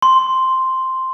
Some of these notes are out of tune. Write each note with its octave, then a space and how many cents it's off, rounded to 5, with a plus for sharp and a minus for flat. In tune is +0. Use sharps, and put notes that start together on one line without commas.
C6 +0